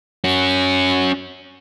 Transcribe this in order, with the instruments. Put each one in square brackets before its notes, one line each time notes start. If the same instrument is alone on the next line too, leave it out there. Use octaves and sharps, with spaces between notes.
[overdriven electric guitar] C#4 F#4